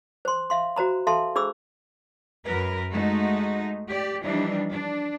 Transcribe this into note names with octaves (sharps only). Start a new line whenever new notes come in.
C5 C6
E5 F5 C6
F#4 C5 A#5 B5
A4 E5 F5 A5 C6
D4 G#4 C5 B5 D6 E6
F#2 A#4 B4
G#3 A3 D#4 F#4
G4 D5
E3 F3 G3 D4 D#4
D4